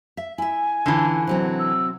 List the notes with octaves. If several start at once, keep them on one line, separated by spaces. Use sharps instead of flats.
E5
E4 E5 G#5
D3 E3 C#4 D4 F4
C3 F#3 C4
E6